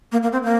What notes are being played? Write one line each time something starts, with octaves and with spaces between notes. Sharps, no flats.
A#3
A#3
C4
A#3